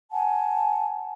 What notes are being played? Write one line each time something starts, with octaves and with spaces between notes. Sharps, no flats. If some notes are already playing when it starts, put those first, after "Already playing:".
F#5 G#5 A5